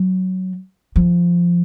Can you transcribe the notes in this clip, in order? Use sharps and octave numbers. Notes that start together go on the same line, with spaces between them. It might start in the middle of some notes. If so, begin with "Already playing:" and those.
Already playing: F#3
F3